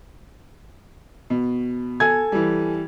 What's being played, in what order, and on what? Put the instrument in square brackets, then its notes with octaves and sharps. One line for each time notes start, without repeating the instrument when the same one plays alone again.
[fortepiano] B2
[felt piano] A4 G#5 G#6
[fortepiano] E3 G3